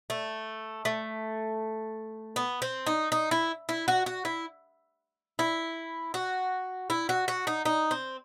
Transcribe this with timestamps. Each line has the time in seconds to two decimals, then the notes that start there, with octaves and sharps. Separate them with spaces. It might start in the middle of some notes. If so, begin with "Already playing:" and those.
0.10 A3
0.85 A3
2.36 B3
2.62 C4
2.86 D#4
3.12 D#4
3.31 E4
3.69 E4
3.88 F#4
4.06 F#4
4.25 E4
5.39 E4
6.14 F#4
6.90 E4
7.09 F#4
7.28 F#4
7.47 D#4
7.65 D#4
7.91 C4